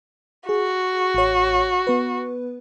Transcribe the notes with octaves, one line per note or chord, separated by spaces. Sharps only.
F#4 G#4
A1 C#5
B3 B4